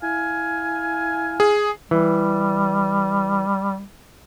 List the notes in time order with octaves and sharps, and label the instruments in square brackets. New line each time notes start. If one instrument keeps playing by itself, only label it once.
[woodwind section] E4 F5 G#5
[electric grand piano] G#4
[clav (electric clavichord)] E3 [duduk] G3